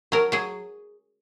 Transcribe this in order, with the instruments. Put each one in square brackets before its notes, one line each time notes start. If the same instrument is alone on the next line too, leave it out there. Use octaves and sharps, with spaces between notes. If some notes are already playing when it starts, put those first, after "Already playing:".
[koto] F#3 A#4
F#3 G#4